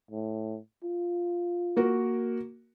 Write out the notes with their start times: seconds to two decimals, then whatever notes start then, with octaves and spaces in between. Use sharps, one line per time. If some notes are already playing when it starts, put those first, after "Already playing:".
0.11 A2
0.84 F4
1.77 A#3 F#4 A#4